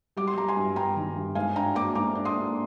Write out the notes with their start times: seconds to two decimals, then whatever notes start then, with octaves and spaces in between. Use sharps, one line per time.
0.17 G3 D6
0.27 C6
0.37 G3 A#5
0.48 G#5 C6
0.57 G2
0.76 G2 G5 A#5
0.96 D#3
1.16 G2
1.35 G#2 F5 G#5
1.55 D4 G5 A#5
1.75 A#3 A#5 D6
1.95 G#2 A#5 D6
2.15 D4
2.25 C6 D#6
2.35 A#3